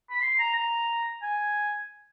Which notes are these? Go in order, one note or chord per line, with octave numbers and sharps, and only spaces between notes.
B5
C6
A#5
A#5
G#5